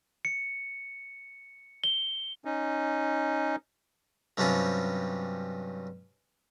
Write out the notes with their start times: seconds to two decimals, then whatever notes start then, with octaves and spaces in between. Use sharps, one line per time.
0.25 C#7
1.84 G7
2.45 C#4 D#4
4.37 G2 C3 F#3 G3 C#4 F4